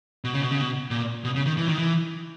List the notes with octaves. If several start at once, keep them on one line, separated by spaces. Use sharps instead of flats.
B2
C#3
B2
C#3
B2
A#2
B2
C#3
D#3
E3
D#3
E3